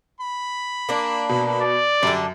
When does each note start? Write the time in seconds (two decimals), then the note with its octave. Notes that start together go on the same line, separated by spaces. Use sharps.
0.20 B5
0.89 A#3 D4
1.29 B2
1.61 D5
2.03 F#2 D3 G3 D4